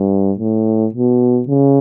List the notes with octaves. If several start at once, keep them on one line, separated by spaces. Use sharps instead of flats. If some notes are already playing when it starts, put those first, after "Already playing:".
Already playing: G2
A2
B2
C#3